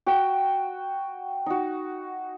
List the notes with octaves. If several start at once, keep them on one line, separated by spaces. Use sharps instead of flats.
F#4 G5
D#4 F#4